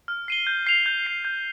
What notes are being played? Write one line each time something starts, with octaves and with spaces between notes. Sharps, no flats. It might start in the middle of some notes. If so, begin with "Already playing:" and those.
F6
C7 D#7 G7
G6
C7 F7
G6
C7 F7
G6